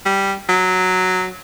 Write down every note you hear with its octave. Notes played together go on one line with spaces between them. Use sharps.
G3
F#3